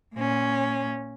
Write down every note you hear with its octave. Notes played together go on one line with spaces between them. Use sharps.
A#2 C#4